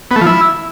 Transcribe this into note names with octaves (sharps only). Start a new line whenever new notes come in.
B3
A3
F3
E4